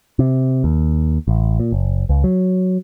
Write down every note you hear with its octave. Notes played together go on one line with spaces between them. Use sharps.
C3
D#2
A1
A#2
F#1
C#2
F#3